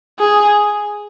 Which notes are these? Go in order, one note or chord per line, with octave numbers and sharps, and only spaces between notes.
G#4